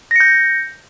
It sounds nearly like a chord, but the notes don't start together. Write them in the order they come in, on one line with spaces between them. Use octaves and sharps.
A#6 C#7 G6